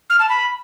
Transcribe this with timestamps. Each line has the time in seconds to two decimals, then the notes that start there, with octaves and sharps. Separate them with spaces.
0.10 F6
0.19 A5
0.29 B5